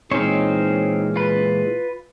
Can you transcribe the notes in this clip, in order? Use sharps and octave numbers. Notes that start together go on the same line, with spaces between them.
A#2 E3 G#3 C4 C#4 D#4 C5 C#5
F4 B4